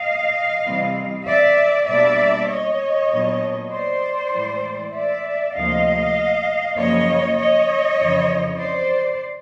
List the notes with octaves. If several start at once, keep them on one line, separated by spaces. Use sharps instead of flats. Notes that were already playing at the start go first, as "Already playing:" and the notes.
Already playing: D#5 F5
C3 E3 G3 C4
D5 E5
B2 G3 A#3 D4 D5 E5
C#5 D#5
A#2 F#3 B3 D4
C5 D5
A2 E3 G#3
D5 E5
D2 C3 F3 A#3 D#5 F5
F#2 C#3 F3 A#3 C#4 C#5 D#5
C#5 D#5
F2 C#3 E3
C5 D5